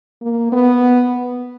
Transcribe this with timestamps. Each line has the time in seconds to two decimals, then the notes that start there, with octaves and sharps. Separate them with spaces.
0.22 A#3
0.52 B3